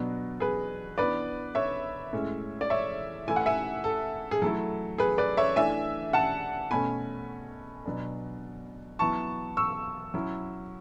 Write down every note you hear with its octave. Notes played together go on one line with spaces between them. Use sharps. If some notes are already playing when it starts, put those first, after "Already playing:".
Already playing: B2 F#3 B3 D4
G#4 B4
E3 B3 D4 B4 D5
C#5 E5
A2 G#3 C#4
D5
C#5 E5
E3 A3 E4 G#5
F#5
E5 G#5
A4
G#4
F#3 A3 E4 A4
G#4 B4
B4 D5
C#5 E5
E3 A3 D4 E5 G#5
F#5 A5
B2 A3 C#4 G#5 B5
B2 F#3 B3 D4
F#3 B3 E4 A5 C#6
C#6 E6
F#3 C#4 E4